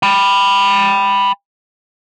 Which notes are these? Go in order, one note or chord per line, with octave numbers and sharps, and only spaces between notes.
G5 B5